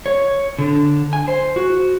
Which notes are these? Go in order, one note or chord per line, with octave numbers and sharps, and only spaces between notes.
C#5
D3
G#5
C5
F#4